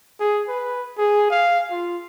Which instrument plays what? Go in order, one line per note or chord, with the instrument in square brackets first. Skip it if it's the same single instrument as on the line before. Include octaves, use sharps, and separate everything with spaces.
[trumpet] G#4
B4
G#4
F5
F4